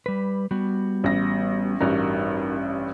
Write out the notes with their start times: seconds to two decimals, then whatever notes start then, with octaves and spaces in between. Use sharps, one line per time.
0.06 G3 B4
0.51 G3 B3 F#4
1.04 A1 A#6
1.81 A1 G2 D#4 F#4 A#4